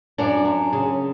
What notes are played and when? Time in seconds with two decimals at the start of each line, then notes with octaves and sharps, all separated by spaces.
0.18 F#2 D4 D5
0.45 F#2
0.73 C#3